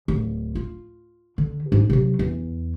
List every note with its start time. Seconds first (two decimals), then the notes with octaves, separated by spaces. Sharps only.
0.08 D1
0.55 F4
1.38 D3
1.72 G#2 D4
1.90 C3 F#3
2.19 E2